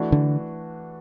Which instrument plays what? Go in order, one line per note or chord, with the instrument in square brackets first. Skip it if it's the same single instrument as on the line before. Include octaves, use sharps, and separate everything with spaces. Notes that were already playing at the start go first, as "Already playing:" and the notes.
Already playing: [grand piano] E3 A3 D4 F#4
[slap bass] D3